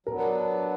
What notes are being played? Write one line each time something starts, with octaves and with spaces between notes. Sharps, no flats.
F#3 B3 D4 A#4